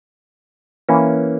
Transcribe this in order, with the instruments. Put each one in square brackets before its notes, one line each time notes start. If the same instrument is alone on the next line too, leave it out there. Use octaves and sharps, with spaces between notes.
[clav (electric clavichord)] E3 A#3 C#4